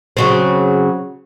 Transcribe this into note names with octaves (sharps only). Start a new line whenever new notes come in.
C#3 F#3 C4